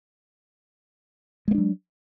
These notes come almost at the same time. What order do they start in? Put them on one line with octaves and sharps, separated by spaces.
G#3 A#3 D4 F#3